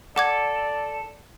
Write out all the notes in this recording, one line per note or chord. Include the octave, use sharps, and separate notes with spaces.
A4 D5 F#5 D6 G#6